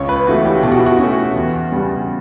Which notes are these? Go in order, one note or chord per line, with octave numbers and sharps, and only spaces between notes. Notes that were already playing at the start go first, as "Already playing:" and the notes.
Already playing: C#2 C#5
B4
C#3 E3 A3 F#4
G4
B2 G4
F#4
E4
F#4
A3 C#4
E2
C#3 G3